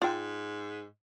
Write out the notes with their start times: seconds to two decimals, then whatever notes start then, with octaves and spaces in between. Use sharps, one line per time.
0.02 G#2 F4 G5